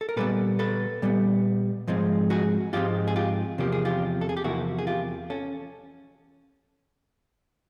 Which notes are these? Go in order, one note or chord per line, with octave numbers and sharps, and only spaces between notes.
A4
A#4
A#2 G3 B3 A4 B4
A4 B4
A#2 G3 B3
G#2 F3 G#3 C4
F#4 G#4
G#2 F3 G#3 C4 F4 G4
G#4
F4 G4
E2 C3 F3 A#3 G4
G#4
F4 G4
A4
G#4
G4
E2 C3 F3 A#3 E4 F#4
G#4
F4 G4
C#4 A4